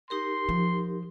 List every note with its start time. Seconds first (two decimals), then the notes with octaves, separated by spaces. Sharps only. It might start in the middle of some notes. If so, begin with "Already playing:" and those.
0.10 D#4 G4 A#4 C6
0.49 F3